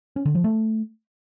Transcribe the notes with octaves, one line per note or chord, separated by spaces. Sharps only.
C#4
D3
F3
A3